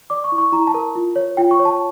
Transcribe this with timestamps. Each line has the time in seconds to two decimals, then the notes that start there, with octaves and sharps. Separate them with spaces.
0.10 D5 D6
0.24 C#6
0.32 E4
0.38 C#6
0.52 E4 A#5
0.67 A5
0.74 A#4
0.95 F4
1.16 C#5
1.37 F4 G5
1.51 C#6
1.59 C#5
1.65 A5